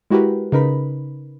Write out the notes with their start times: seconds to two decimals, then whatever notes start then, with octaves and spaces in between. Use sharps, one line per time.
0.11 G#3 E4 F#4 G4 A#4 B4
0.52 C#3 D#4 A#4 B4 B5